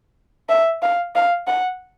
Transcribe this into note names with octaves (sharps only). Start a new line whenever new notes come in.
E5
F5
F5
F#5